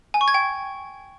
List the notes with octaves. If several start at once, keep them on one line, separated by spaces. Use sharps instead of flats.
G#5
C#6
G#6
G5